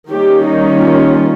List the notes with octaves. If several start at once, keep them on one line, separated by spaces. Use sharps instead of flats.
D#3 G3 A#3 C#4 G4
D#4
F4